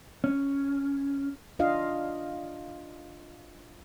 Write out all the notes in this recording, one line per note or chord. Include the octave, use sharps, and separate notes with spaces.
C#4
D4 F4 D#5 F5